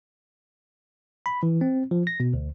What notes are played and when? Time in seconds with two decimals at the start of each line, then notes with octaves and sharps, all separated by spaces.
1.26 B5
1.43 E3
1.61 C4
1.91 F3
2.07 A#6
2.20 B2
2.33 D2